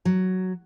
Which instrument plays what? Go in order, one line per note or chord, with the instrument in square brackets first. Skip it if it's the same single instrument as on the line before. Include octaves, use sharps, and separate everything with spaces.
[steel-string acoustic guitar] F#3